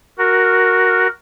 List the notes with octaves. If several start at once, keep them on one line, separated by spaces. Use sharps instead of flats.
F#4 A#4